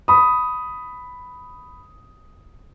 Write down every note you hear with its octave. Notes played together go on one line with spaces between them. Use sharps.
B5 D#6